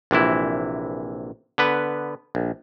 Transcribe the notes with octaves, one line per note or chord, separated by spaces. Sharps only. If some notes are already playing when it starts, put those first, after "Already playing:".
A#1 C3 E3 E4
D3 B3 B4
A#1